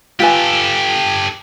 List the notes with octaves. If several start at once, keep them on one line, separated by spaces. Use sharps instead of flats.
F4 G4 A4 B4 G#5